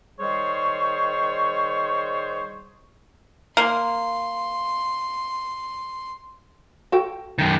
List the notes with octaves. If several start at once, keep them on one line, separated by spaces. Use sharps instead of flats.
D#3 G3 G#4 C5 C#5 C#6
A#3 C6
F#4 A4 G5
F#2 D#3